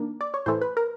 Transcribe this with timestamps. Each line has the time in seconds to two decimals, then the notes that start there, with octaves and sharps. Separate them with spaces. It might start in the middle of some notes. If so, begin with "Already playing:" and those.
Already playing: D#3 A#3 D4
0.21 D5
0.34 C#5
0.46 A2 E3 A3 C5
0.61 B4
0.77 A#4